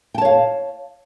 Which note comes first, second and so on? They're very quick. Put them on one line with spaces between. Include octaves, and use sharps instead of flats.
G5 A5 C#5 F5